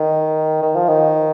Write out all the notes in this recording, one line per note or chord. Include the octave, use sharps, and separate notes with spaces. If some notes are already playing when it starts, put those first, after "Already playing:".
Already playing: D#3
D#3
F3
D#3